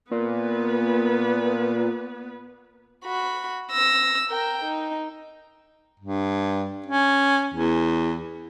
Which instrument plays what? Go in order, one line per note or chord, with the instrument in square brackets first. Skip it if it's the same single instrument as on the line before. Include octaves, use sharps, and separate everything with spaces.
[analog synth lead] A#2 [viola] B3 B4
[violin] F#4 B5
E6 A#6
A#4 G5
D#4
[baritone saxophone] G2
C#4
E2